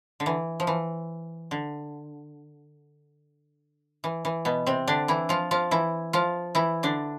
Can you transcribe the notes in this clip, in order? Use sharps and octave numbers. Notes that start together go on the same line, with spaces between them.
D3
E3
F3
E3
D3
E3
E3
B2 B3
C3 C4
D3 D4
E3 E4
F3 F4
F3 F4
E3 E4
F3 F4
E3 E4
D3 D4